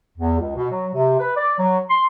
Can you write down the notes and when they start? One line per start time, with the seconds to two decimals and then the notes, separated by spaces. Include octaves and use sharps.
0.18 E2
0.40 C#2
0.56 B2
0.71 F#3
0.94 C3
1.20 B4
1.37 D5
1.59 F#3
1.90 C6